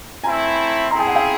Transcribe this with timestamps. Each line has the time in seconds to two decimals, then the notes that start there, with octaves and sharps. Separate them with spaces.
0.23 A3 C4 E4 G#5 A#5
0.91 C4 E4 G#4 A#5 C6
0.99 G5 A5
1.07 F#5 G#5
1.16 F5 G5